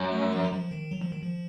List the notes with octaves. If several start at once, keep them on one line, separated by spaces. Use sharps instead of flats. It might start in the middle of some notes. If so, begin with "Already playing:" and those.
Already playing: F#2
A3
F3
F#3
F3
D#3
F#3
F3
D#3
F3